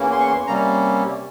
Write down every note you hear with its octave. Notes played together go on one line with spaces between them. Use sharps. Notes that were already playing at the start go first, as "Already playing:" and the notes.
Already playing: E2 E3 A#3 C#4
C6
C#6
C6
C3 G3 A#3 C#4 A#5